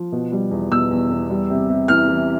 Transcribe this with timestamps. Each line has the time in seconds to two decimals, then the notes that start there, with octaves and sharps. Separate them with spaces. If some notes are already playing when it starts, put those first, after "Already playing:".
Already playing: F3
0.12 B2
0.32 G3
0.51 E2
0.71 B2 E6
0.91 E2
1.10 E2
1.30 G3
1.50 C3
1.69 C3
1.88 E3 F6
2.09 E3